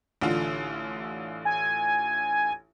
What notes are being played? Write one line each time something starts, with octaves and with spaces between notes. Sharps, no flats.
A1 D3 F4
G#5